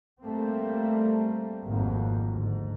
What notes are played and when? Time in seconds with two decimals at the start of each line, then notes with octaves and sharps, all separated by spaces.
0.22 G3 A3 A#3 C4
1.65 G#1 F2 F#3 A#3
2.33 D2 G#2